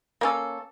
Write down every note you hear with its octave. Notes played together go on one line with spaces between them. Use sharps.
A#3 C#4 A4